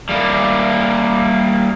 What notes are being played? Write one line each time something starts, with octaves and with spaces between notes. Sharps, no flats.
G3 A#3